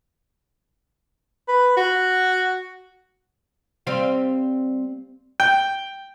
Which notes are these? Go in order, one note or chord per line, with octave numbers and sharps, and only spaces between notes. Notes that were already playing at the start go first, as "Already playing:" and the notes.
B4
F#4
G3 C4 F5
G5